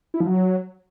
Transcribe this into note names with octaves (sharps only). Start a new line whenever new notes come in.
E4
F3
F#3